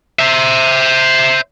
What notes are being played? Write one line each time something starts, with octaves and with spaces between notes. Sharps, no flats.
C5 E5